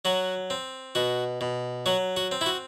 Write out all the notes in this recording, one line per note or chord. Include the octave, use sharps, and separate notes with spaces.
F#3 F#4
C4
B2 F#4
B2
F#3 F#4
F#4
C4
E4
F#4